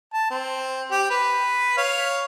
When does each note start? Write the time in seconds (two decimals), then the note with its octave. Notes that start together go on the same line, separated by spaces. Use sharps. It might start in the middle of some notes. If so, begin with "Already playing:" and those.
0.14 A5
0.31 C4
0.91 G4
1.10 B4
1.77 C#5 F5